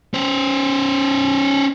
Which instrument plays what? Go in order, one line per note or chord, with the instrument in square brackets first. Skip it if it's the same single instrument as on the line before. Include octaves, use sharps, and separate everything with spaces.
[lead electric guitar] C#4 C5